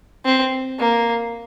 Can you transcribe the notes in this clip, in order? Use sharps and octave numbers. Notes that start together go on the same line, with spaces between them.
C4
A#3